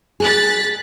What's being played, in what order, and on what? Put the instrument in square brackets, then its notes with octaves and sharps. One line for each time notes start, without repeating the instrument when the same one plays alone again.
[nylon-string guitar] G#4 [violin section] F#6 A6 B6